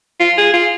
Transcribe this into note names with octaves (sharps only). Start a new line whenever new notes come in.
F4
G#4
F4